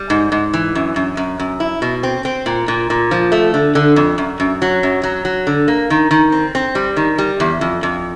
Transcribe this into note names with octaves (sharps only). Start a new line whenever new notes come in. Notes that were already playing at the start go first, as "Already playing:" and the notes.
Already playing: G3
G#2
G#2
E3
F#2
F#2
F#2
F#2
E4
B2
C4
C4
A#2
A#2
A#2
F3
A3
D3
D3
F2
F#2
F#2
F#3
F#2
F#3
F#3
D3
A#3
D#3
D#3
C4
C4
G3
D#3
G3
E2
F2
F2